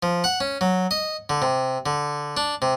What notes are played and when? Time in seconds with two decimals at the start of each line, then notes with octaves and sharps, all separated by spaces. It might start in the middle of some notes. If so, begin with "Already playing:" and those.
0.03 F3
0.24 F#5
0.40 C#4
0.61 F#3
0.91 D#5
1.29 D3
1.42 C3
1.86 D3
2.37 D4
2.62 C3